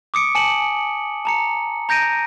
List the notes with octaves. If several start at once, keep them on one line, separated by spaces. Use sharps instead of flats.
D6 D#6 C#7 D7
G#5 A5 C#7 D7 F#7
A5 A#5 C#7
A#5 G6 A#6 D7 D#7